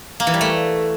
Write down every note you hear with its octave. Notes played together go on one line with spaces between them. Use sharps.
A#3
E3
G3
A3